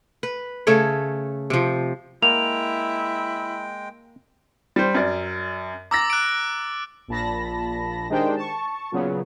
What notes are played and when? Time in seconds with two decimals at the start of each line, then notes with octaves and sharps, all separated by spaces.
0.23 B4
0.67 C#3 A3 A4 C#5
1.50 C3 F3
2.23 G#3 A#3 E4 G5 F7
4.76 G3 C5
4.94 F#2 D5
5.91 A#5 D6 E6 A6 A#6
6.10 F#6 D7
7.08 A#1 A#2 A5 B5 A#6
8.09 D#3 G#3 D4 G4 C5 G5
8.36 A5 C#6
8.92 A#2 C#3 F#3 B3